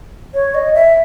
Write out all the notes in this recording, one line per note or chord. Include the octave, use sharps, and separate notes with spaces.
C#5
D#5
E5